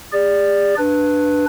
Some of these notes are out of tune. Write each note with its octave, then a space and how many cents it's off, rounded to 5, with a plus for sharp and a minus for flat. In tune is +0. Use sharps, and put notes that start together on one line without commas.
G#4 -45 D5 +0
D4 +5 B4 +0